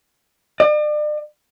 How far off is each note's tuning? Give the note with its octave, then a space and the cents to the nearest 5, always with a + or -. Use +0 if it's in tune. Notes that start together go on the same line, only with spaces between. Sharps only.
D5 +40